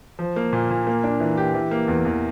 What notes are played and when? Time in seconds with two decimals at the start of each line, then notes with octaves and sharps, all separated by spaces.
0.19 F3
0.36 A#3
0.53 A#2
0.70 A#2
0.87 A#3
1.04 D4
1.20 E3
1.37 G4
1.54 E3
1.71 A#3
1.88 E2
2.05 E2